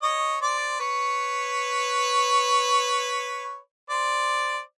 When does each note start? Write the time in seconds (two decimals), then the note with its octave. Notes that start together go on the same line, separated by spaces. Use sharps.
0.02 C#5 D#5
0.41 C5 D5
0.80 B4 C#5
3.90 C5 D5